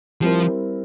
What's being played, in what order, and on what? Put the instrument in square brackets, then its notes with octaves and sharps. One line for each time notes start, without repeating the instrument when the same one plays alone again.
[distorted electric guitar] F3 [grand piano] G3 C4 E4 A#4